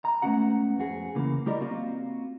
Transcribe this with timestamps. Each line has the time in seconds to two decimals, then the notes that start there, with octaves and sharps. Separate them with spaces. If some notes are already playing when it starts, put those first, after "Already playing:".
0.05 A#5
0.22 G#2 A3 B3 C#4 F#4 F#5
0.79 F2 F#4 G#4
1.15 C#3 E3 A#3
1.46 G3 E4 G4 A#4 D5 D#5
1.60 A#3 C4 F4 F#4